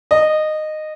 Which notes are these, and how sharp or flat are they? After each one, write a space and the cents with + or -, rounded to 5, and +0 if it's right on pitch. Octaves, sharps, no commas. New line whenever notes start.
D#5 -15